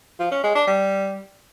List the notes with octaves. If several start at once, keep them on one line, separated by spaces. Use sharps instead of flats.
F3
C#4
G#3
D4
G3